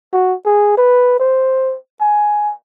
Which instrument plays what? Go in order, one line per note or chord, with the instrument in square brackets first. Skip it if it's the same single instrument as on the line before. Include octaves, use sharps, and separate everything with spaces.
[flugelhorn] F#4
G#4
B4
C5
G#5